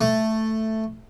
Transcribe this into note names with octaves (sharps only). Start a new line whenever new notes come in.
A3